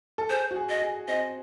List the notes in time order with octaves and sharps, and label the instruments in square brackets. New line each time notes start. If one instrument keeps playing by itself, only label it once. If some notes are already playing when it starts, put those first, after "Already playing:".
[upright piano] A4
[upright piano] G#4 [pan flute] C5
[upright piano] F#4
G#4
[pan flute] D#5
[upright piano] G#4
[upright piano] C4 [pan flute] D#5